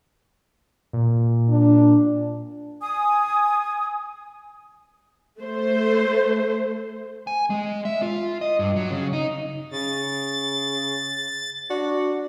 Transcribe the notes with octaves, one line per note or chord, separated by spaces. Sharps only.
A#2
D4
G#5 D#6
A3 C5
G#5
G#3
E5
F4
D#5
G2
F#3
C#3
D#4
C#3 A6
D4 F#4